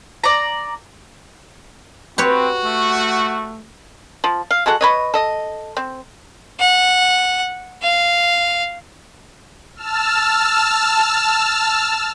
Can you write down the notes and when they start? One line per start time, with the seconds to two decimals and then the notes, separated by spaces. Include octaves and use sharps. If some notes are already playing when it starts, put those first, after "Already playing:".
0.24 D5 A#5
2.18 C4 F#4 G4 B4 C#5
2.65 A3
4.24 F3
4.51 F5
4.66 G#3 F#4 A4 F#5
4.81 B4 C#5 D#5
5.14 A4 D#5
5.77 C4
6.60 F#5
7.83 F5
9.75 A5 E6 F6